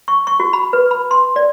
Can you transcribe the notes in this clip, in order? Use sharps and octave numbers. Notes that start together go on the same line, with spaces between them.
C#6
C#6
F#4
B5
B4
B5
C6
D5